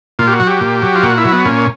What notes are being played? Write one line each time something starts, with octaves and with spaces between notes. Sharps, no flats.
A#2 F4
G4
F#4
F#3
G4
A#2
F#3
F4
A#2 F#4
E4
F#3
B3
A#2 C#4